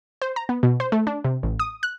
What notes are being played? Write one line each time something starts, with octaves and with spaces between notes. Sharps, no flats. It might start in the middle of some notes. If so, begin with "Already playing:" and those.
C5
A#5
B3
B2
C5
A3
D4
C3
A1
D#6
F#6